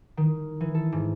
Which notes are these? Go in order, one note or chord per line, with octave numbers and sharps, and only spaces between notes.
D#3
E3
A4
G#2